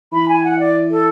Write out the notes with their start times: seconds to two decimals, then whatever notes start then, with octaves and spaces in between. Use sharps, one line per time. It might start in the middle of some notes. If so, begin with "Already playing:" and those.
0.12 E3 B5
0.28 G#5
0.43 F#5
0.59 D5
0.90 A4